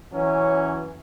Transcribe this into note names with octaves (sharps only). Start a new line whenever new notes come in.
E3 F#3 C#4